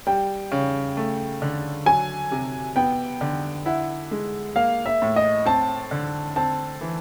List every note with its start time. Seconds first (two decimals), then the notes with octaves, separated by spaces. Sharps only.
0.07 G3 G5
0.52 C#3
0.97 A3
1.42 D3
1.86 F#3 G#5
2.32 C3
2.76 B3 G5
3.21 D3
3.66 E4 F#5
4.11 G#3
4.56 A#3 F5
4.86 E5
5.02 A2
5.16 D#5
5.45 C4 A5
5.91 D3
6.36 C4 A5
6.81 E3